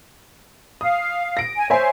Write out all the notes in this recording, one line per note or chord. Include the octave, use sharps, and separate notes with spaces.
F5 D#6
A#6 D7
G#5
C5 C#5 E5 G#5